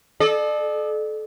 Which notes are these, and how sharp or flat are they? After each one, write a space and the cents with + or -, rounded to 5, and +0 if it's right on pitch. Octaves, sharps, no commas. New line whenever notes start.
A4 -30 D5 +40